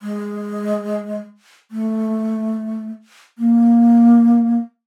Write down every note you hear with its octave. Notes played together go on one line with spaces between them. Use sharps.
G#3
A3
A#3